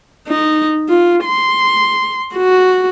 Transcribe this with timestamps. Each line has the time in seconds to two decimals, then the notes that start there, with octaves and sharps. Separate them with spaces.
0.28 D#4
0.89 F4
1.25 C6
2.36 F#4